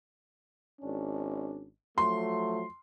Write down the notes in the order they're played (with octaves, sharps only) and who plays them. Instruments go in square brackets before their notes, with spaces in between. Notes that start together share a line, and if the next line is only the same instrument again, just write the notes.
[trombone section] G#1 C#4 D4
[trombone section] F3 F#3 A3 [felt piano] C6